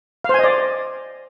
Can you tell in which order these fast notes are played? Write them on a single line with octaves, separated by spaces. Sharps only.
F5 C5 G#5 D#5 D5